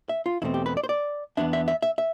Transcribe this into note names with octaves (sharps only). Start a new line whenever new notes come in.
E5
F4
E2 B2 A3 C4 E4
G4
B4
D5
C5
D5
E2 B2 B3 D4 E5
E5
E5
E5
E5